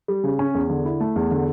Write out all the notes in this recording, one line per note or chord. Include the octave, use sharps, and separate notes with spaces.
G3
C#3
C#4
E2
D3
E4
A3
E2
D3